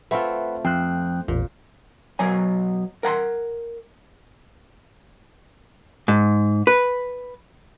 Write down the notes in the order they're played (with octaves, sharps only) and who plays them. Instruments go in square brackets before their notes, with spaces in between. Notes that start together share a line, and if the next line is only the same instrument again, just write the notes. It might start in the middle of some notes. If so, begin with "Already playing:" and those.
[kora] A3 C4 F4 [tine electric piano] B4 F#5 B5
[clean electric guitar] F2 [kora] C5 [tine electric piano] G5 F#6
[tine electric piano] A1 E2 [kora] A#2
[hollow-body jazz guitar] B2 F#3 C#5 G#5
A#4 F#5 A#5 C6
G#2
B4